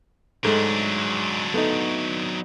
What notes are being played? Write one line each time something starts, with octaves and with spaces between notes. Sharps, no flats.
G#2 F#3 G#3 A3 D4
A3 B3 D#4